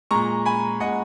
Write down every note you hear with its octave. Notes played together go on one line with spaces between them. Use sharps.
A#2 G#3 A#5 C#6
G#5 B5
A#2 G#3 D#5 F#5